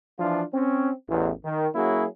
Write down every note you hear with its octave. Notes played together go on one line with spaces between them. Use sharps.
E3 F3 D4 F4
C4 C#4
A1 E2
D#3
F#3 A#3 C#4 E4 F#4 G#4